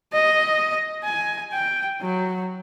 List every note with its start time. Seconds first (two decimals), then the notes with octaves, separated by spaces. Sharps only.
0.13 D#5
1.04 G#5
1.53 G5
2.01 F#3